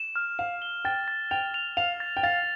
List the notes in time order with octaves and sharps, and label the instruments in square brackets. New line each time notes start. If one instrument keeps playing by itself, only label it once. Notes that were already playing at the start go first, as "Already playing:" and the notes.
Already playing: [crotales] E7
F6
[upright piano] F5 [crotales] E7
[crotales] G7
[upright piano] G5 [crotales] A6
[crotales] A6
[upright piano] G5 [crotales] F7
[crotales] F7
[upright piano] F5 [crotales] F7
[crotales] A6
[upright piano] G5
[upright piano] F5 [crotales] A6